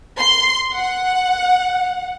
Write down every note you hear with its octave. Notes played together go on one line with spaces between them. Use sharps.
C6
F#5